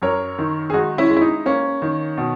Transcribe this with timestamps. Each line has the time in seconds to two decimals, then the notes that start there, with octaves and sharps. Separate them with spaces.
0.02 F#2 A#4 C#5
0.39 D#3
0.70 G#4
0.74 G#3 D#4 F#4
0.98 C#4 E4
1.10 G#3
1.17 E4
1.21 D#4
1.46 A#3 C#4
1.82 D#3
2.18 B2